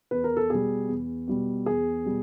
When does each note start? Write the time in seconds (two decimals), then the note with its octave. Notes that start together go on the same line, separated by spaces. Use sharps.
0.11 E2 B4
0.24 A#4
0.37 A4
0.50 B2 G3 G#4
0.88 E2
1.28 B2 G3
1.66 E2 G#4
2.06 B2 G3